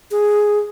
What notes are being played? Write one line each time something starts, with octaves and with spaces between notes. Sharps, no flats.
G#4